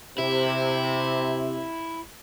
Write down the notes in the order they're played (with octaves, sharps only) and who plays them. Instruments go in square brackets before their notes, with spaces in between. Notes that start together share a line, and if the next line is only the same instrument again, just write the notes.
[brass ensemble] C3 [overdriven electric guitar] E4